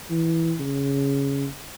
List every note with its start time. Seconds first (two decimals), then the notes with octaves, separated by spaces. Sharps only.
0.10 E3
0.59 C#3